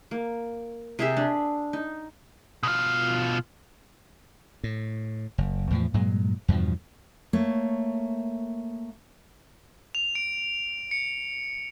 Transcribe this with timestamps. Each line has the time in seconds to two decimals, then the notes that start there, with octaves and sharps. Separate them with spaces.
0.11 A#3
0.99 C3 G#4 E5
1.17 D4
1.73 D#4
2.63 B2 F4
4.64 A2
5.38 F#1
5.71 E2 A2 F3
5.94 G2 A#2 F#3 G#3
6.48 E2 G2 B2 F3
7.33 A3 A#3 C#5
9.95 F7
10.15 D7
10.91 C#7